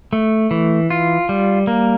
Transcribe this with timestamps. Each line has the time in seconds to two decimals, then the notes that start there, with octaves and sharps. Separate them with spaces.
0.13 A3
0.51 E3
0.90 F4
1.29 G3
1.67 A#3